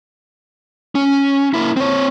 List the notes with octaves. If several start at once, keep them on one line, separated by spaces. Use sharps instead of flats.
C#4
A#3 E4
C4 C#5